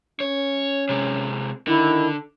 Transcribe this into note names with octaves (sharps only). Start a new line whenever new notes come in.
C#4 C#5
C3 G#3
D3 D#3 E4